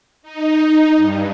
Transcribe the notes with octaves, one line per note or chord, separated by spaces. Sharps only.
D#4
G2